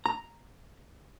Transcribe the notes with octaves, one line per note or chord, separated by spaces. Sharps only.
A#5